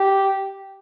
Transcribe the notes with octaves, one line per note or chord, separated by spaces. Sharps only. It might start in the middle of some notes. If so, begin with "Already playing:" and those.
Already playing: G4